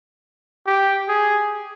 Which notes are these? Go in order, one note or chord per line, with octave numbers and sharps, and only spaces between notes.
G4
G#4